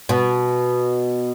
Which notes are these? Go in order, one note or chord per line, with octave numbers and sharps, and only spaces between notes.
B2